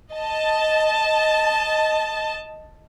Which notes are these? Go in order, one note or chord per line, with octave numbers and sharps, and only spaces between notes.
D#5 A5